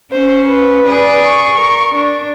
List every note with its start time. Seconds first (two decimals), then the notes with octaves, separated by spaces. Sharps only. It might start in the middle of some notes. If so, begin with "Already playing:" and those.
0.12 C#4 C5
0.47 B4
0.87 G#4 D5
1.27 C#6
1.59 A#4
1.95 D4